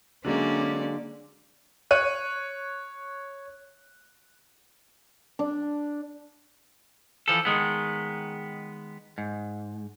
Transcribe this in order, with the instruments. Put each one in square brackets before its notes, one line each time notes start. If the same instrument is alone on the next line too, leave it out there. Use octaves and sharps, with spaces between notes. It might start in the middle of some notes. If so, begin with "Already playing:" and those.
[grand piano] D3 F#3 G#3 [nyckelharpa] A#3 D5 [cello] C#4 [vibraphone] D4
[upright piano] C#5 F#6 D#7
[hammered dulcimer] D4
[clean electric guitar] E3 F3 A4
D#3 G#3 B3
G#2